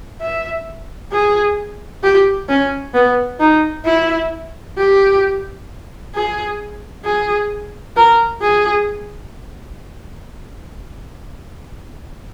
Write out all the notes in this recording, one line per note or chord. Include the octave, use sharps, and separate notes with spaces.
E5
G#4
G4
C#4
B3
D#4
E4
G4
G#4
G#4
A#4
G#4